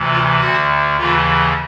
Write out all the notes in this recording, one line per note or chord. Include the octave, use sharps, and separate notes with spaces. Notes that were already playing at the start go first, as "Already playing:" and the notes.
Already playing: D2 C3 E3
F4
D2 D3 F#4
D#2 C#3 E3 F4